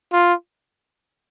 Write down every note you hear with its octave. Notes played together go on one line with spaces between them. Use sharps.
F4